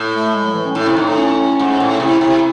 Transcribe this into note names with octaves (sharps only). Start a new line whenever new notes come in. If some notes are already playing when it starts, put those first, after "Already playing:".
Already playing: A2
A3
G#3
F#3
E3
C#4
A2 E4
C3
A2 D#4
C#4
G#2
A2
C3 E4
C3 E4